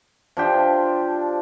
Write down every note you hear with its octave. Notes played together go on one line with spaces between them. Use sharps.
F3 D4 G4